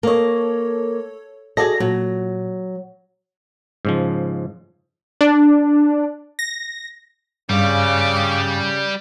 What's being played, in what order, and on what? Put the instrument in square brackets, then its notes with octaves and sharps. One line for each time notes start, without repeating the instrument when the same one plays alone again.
[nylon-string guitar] A#3 D#5 [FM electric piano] A4 C#5
[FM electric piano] F#4 A4 A#6 [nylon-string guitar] G#4 D5 D#5
[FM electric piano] A#2 [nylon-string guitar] F#3
[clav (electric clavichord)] G#2 C#3 F3
[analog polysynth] D4
A#6
[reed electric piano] G2 F5 [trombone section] C#3 [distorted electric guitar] G3 [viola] D6